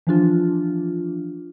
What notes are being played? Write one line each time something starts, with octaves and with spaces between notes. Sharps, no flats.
E3 F3 D4 F4